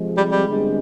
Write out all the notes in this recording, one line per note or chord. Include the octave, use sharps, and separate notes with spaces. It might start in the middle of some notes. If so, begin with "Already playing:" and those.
Already playing: F2 C3 F3 G#3
G3
G3
G1 G2 D3 G#3 C4